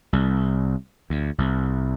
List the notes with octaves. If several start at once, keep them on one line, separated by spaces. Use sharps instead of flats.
C2
D2
C2